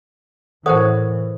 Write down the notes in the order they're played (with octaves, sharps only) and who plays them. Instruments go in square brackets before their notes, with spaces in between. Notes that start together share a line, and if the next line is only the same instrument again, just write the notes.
[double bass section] A2 E3 [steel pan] A4 C#5 F#5 [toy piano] A#4 C5 D#6